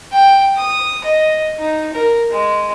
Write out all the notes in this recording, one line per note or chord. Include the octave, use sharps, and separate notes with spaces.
G5
D#6
D#5
D#4
A#4
G#3